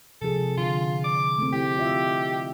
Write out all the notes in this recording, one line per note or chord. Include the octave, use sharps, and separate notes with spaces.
C3 F3 G#4 A4
D3 F4
D6
A3 C4
E4 G4
F4 D#5 E5